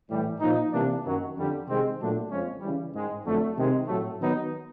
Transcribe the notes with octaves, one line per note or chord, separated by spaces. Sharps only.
A2 E3 G3
A#2 F3 A#3 D#4
C3 E3 G3 A#3 D4
F#2 D#3 F#3
F2 D3 G3
C3 D#3 G#3 C4
A#2 F#3 A3 D4
F2 C#3 F3 G#3 C#4
C#3 E3 G3
G#2 D#3 G#3
F2 D3 F#3 A3
C3 D#3 G#3
A2 F#3 A3
D#3 F#3 B3 D#4